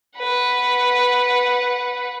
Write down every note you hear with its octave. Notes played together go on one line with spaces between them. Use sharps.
B4 F#5